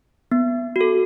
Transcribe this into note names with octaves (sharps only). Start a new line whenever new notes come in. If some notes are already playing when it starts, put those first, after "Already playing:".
B3
F#4 A4